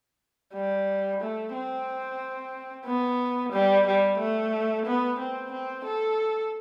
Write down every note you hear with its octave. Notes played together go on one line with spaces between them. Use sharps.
G3
A3
C4
B3
G3
G3
A3
B3
C4
C4
A4